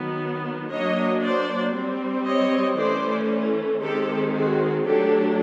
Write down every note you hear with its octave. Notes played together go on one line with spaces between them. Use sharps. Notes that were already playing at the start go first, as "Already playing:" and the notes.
Already playing: D#3 F#3 B3
F#3 A#3 D4 C#5 D#5
C5 D5
G3 C4
C#5 D#5
E3 A3 C#4 C5 D5
D#3 G#3 C4 G4 A4
F#4 G#4
F#3 A3 D4 G4 A4